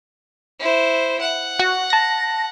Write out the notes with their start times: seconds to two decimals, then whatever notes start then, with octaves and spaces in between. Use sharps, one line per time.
0.59 E4 C5
1.21 F#5
1.59 F#4
1.90 A5 A#6